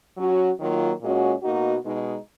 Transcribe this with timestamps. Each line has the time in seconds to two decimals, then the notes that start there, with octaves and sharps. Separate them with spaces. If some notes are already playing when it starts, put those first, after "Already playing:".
0.17 F#3 C#4 F#4
0.59 D#3 F#3 A#3 F4
1.01 A#2 G#3 C#4 F#4
1.42 B2 A#3 D#4 F#4
1.84 B2 G#3 D#4